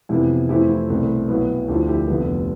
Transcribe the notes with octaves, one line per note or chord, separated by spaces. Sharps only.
F2 C3 E3 B3 E4 G4
F2 E3 A3 C4 E4 G4
E4
C2 B2 A3 C4
B1 B2 B3 E4
D2 D3 F3 E4 G4
E4 G4
F1 F2 D3 G3 B3